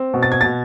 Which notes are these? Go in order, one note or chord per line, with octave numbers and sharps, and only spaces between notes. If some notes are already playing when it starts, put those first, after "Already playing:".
Already playing: C4
B2
A6
G#6
B2 A6